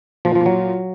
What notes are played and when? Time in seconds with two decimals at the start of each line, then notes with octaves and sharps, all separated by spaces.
0.25 A#2 F3
0.35 F3
0.41 A#2
0.46 F#3